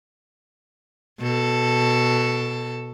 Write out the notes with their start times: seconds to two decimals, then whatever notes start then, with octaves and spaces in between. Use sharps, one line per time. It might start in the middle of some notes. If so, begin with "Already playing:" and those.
1.21 B2 A4